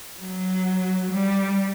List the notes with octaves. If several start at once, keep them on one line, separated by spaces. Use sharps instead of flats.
F#3
G3